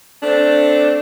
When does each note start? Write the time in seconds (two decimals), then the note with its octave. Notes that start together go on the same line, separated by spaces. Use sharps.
0.23 A3 C4 D4